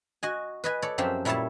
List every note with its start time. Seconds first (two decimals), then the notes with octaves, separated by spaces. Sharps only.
0.23 F#4 D#5 G#5
0.64 B4 D#5 G#5
0.82 A4 C#5 D5
0.98 F#2 F3 C4 G4 E5
1.25 A#2 G3 E4 C#5 E5 A5